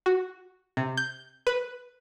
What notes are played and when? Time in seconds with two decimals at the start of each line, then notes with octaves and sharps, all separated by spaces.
0.06 F#4
0.77 C3
0.97 G6
1.47 B4